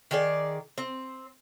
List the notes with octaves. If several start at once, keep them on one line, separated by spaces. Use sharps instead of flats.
D#3 G#4 D5
C4